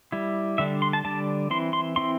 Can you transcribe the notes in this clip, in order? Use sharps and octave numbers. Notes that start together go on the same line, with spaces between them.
G3 E4
D3 G3 D4 E5
C6
A5
D3 G3 D4 A5
E3 C4 E4 C6
C6
E3 C4 E4 C6